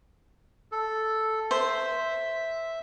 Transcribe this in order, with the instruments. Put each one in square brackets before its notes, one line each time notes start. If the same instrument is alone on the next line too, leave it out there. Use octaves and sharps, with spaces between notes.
[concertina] A4
[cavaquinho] C5 [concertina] E5